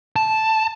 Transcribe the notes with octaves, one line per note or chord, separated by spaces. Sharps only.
A5